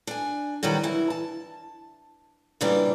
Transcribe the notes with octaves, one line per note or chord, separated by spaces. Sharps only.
D4 G#5
D#3 E3 F#3 G3 F#4
E3 E4
A5
A#2 C#3 E3 G3 D4 A#4